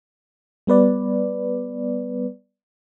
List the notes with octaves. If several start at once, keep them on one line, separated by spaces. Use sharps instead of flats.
G3 B3 B4 D5